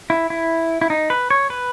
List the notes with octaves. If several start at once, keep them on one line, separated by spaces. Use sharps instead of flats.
E4
E4
E4
D#4
B4
C#5
B4